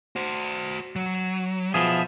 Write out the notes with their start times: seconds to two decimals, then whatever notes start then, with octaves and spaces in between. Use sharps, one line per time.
0.16 F#4 C5
0.96 F#3
1.74 B2 F3 G#4 E5